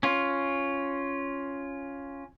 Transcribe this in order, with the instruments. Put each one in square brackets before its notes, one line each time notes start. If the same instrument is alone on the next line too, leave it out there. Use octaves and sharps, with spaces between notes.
[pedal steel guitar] C#4 F4